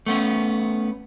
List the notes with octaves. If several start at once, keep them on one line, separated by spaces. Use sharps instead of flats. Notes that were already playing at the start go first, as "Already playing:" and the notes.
A3 B3 C#4